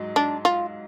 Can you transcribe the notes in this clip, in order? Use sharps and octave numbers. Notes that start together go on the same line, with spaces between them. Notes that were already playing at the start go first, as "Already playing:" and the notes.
Already playing: G#2 F#3
D4
F4